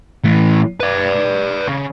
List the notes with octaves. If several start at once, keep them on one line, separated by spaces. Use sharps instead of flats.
A2 E3
B4 D5
C#3